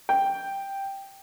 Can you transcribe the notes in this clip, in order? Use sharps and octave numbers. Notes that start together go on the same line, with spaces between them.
G5